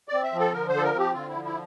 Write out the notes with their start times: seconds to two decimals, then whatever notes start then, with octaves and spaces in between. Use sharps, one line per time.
0.08 C4 D5
0.23 E5
0.33 F3
0.39 A4
0.53 D3 A#4
0.68 C5
0.74 F3 A4
0.84 A#4
0.94 C4 G4
1.14 D3 F4
1.29 F3 E4
1.45 E4